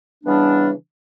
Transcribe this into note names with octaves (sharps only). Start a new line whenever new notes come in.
C#3 E3 G3 B3 D4